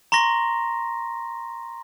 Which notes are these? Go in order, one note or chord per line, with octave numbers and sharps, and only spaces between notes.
A#5 C6 C#6 A#6